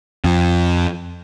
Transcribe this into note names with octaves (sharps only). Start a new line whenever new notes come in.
F2